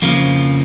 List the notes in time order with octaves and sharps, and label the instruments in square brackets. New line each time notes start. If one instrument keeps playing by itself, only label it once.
[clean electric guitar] F2 C#3 F3 A#3